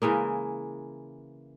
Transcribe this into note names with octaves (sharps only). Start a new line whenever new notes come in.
C#3 E3 G#3 A#3